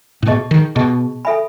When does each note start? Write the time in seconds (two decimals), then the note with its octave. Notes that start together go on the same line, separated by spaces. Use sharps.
0.23 A2
0.27 B2 G#4 D#5 A5 C#6
0.51 D#3
0.76 B2 G#4 D#5 A5 C#6
1.25 A4 E5 G#5 B5